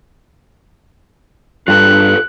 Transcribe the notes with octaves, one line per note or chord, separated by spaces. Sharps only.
G2 F4 A4 B4 F#6